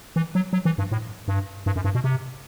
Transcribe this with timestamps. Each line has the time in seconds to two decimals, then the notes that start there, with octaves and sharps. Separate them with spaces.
0.16 E3
0.35 F#3
0.53 F#3
0.65 E3
0.78 G2
0.91 A2
1.28 G2
1.66 G2
1.76 F#2
1.84 G2
1.95 B2
2.04 C3